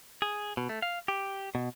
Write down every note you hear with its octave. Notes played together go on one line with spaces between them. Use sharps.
G#4
B2
A3
F5
G4
B2